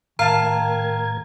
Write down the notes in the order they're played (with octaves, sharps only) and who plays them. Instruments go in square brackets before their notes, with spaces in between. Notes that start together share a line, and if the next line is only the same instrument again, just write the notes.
[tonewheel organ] A2 A#4 G#6 [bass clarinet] D#3 [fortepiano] F5 A5 [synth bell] A#5